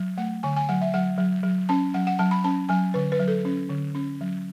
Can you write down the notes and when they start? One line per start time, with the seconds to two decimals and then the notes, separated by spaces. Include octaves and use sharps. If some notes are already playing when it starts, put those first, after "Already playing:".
Already playing: F#3
0.18 A3 F#5
0.43 D3 G#5
0.56 G#5
0.69 F#3 F#5
0.81 E5
0.94 F#3 F#5
1.18 F#3
1.43 F#3
1.69 C#4 A5
1.94 F#3 F#5
2.07 F#5
2.19 F#3 A5
2.31 B5
2.44 C#4 A5
2.69 F#3 G#5
2.94 D3 B4
3.12 B4
3.19 F#3
3.28 A4
3.45 C#4
3.69 D3
3.95 C#4
4.21 F#3